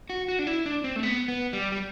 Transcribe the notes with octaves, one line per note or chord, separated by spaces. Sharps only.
F#4
F#4
D4
E4
D4
C4
A3
B3
B3
G3
G3